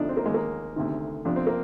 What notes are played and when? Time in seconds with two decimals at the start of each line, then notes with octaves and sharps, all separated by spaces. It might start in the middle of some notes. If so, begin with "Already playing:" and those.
Already playing: D2 C3 F3 D4 D#4
0.09 C4
0.17 A#3
0.25 D#2 D#3 G#3
0.34 A#3
0.76 D2 C3 D#3
1.25 F2 C3 F3 D4
1.36 C4
1.47 A#3